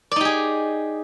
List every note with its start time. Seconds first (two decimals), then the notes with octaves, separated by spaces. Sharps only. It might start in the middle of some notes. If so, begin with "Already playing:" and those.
0.12 D5
0.16 D#4
0.21 G4
0.25 G#4